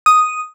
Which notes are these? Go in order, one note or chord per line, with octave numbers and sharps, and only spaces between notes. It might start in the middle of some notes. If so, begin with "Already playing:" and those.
D#6